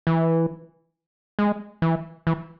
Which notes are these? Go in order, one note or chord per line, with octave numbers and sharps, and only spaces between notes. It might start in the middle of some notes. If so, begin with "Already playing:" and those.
E3
G#3
E3
E3